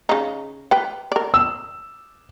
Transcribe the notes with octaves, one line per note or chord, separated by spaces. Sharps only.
C#3 D#4
B4 G5
A#4 D5
E6